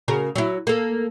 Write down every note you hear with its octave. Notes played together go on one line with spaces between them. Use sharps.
C#3 F#4 A#4
F#3 E4
A#3 A4